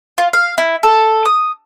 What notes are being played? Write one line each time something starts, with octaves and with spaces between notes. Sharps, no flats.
F4
F5
E4
A4
D#6